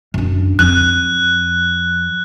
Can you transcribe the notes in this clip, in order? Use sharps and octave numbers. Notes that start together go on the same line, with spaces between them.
F#2 D4
F2 F3 F#6